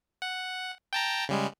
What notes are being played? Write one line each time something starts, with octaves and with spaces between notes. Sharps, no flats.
F#5
G5 A5 A#5
C#3 G3 G#3